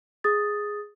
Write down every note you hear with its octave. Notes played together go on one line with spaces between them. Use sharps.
G#4 D#6 A6